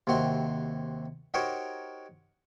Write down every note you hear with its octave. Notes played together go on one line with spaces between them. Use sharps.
D#2 C3 C4 F#4 A#5 C6
D#4 F#4 G4 A#4 C5 C#5